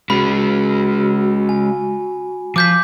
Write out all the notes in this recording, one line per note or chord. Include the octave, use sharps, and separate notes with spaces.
G#3 C#4 F#4 B5
F#4
G#5
F3 D6 G6 B6